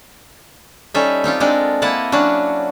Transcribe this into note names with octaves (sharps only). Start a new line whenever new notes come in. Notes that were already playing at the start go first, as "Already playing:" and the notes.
G3 C#4 D#4 A4 E5
C4 D#4 F4 G4
G#3 C4 D4 A4 A#4
A#3 E4 D#5 F#5 A5
F#3 C#4 D4 F#4